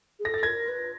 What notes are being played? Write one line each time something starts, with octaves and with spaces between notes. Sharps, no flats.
G#4
A4 A#6
A6
A#4 G#6 A#6
B4